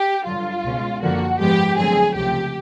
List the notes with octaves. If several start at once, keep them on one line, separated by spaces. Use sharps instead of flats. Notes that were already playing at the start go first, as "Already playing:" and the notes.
Already playing: G4
G2 D3 F#3 F4
C#2 B2 G#3 C#4
F#2 D3 F3 A#3 F#4
G#2 F3 G#3 B3 G4
F2 D3 F#3 A3 C4 G#4
C#2 C3 F3 A3 G4